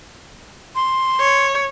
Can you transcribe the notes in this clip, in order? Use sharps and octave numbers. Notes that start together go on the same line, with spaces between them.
C6
C#5